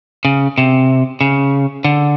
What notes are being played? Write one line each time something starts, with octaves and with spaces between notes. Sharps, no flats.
C#3
C3
C#3
D3